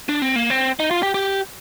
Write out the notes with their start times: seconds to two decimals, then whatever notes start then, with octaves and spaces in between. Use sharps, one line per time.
0.09 D4
0.22 C4
0.36 A#3
0.50 C4
0.80 D#4
0.91 F4
1.03 G4
1.14 G4